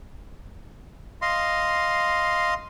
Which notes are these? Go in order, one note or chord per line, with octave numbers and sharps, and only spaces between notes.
D#5 F5 C6